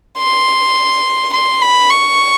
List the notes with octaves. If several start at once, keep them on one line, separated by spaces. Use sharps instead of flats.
C6
C6
B5
C#6